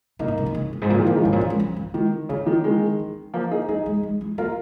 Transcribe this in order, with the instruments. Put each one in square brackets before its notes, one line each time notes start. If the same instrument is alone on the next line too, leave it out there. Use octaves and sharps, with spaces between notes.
[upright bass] C#3 [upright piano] A#3 D#4
[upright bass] A#2
C#3
D#3
C#3
F2
G#2
[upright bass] A#2 [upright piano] F3 A#3
[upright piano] D#3 G#3
[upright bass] F2 [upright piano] F3 A#3
[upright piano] D#3 G#3
[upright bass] G#2 [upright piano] C#3 F3
[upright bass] A#2
D#3
G#3
F3
D#3
[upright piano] D#3 [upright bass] G#3
[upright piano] C#3 [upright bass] C#4
[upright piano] D#3
D#3 G#3
[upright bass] C#4
[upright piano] F3 A#3
D#4 G#4
[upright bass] A#3 [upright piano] D#4 G#4
[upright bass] G#3
G#3
G#3
[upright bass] A#3 [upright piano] F4 A#4